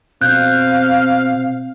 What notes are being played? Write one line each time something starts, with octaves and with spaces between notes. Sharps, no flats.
B2 C4 F5 F#6 G6